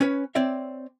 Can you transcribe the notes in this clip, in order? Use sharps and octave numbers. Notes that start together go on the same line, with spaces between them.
C#4 B4 C#5
C4 C#5 D5 E5